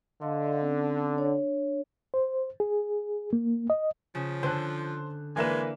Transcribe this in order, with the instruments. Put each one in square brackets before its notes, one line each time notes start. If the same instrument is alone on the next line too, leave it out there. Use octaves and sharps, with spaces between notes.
[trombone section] D3 [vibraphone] D#5 F5 C6
[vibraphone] C4 C#4
D4 C#5
[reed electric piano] C5
G#4
A#3
D#5
[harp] C#3 [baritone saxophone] F3
[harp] D3 [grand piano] C5 A5 F#6
[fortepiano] E3 A#3 B4 [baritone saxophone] G#3 [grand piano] D4 A#4 E7